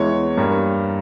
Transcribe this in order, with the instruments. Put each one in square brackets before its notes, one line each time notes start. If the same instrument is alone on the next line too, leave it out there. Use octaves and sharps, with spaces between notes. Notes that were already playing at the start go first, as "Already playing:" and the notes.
Already playing: [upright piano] E2 E3 G#3 C#5
G2 G3 A#3